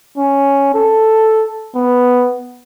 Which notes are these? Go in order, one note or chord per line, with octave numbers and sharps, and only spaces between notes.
C#4
A4
B3